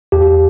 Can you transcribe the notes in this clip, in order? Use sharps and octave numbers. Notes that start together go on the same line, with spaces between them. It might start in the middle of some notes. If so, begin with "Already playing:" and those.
E2 G4